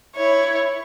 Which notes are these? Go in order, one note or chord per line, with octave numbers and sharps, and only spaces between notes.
E4 C#5